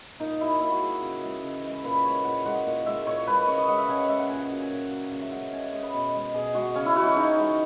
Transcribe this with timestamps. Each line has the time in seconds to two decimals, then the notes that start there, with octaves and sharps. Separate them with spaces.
0.20 A#2 D#4
0.40 F#3 E4
0.60 A#2 E4
0.71 F#4
0.81 F#3 G#4
1.01 C#3
1.22 E3 G#3
1.43 C#3
1.63 E3 G#3
1.84 A#2 B4
2.04 G#3 C#5
2.25 A#2 F#5
2.45 G#3 F#5
2.66 A#2
2.86 G#3 E5
3.07 A#2 C#5
3.27 G#3 B4
3.48 C#3 C#5
3.58 D#5
3.68 G#3 F#5
3.78 E5
3.88 C#3 G#5
3.99 F#5
4.09 G#3 E5
4.19 F#5
4.29 A#2 G#5
4.40 F#5
4.50 F#3 F#5
4.60 G#5
4.70 A#2
4.91 F#3
5.12 C#3 F#5
5.22 E5
5.32 G#3 F#5
5.52 C#3 G#5
5.63 F#5
5.73 G#3 D#5
5.83 B4
5.94 B2
6.14 G#3
6.34 B2 G#4
6.55 G#3 F#4
6.75 C#3 C#4
6.86 E4
6.96 E3 G#3 F#4
7.07 F#4
7.16 C#3 D#4
7.37 E3 G#3